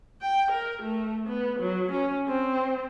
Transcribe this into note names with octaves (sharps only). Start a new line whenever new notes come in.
G5
A#4
A3
B3
F#3
C#4
C4